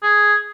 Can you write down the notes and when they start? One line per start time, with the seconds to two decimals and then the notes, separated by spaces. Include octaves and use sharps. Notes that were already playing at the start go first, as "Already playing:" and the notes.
0.03 G#4